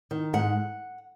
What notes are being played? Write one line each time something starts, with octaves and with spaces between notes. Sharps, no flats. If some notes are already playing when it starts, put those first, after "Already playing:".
D#3
G#2 F#5